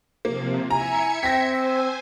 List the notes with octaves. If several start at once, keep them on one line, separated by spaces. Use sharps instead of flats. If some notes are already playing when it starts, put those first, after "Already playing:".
C3 F3 A#3
E4 E5 G#5 A#5 G#6 C#7
C4 G5 A#6 B6
C5 G#5 E6